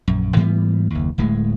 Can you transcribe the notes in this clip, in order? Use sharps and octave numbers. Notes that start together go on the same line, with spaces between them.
A#1 F#2
G#2 E3 G3 B3
F#1 D#2
D1 A2 G#3